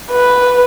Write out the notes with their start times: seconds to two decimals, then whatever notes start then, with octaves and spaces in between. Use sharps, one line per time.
0.11 B4